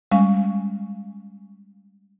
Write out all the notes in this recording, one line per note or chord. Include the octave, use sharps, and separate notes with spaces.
G3 G#3 C#4 F5 G#5